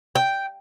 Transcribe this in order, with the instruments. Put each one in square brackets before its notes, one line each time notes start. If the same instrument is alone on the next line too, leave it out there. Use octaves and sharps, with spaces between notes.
[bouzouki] G5